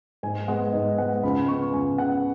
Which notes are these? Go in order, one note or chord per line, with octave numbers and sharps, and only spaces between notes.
G#2 G#5
G#3 B3 F#5
G#2 D#5
G#3 B3 F#5
C#2 B5
C#3 B3 C#6
C#2 G#5
C#3 B3 F#5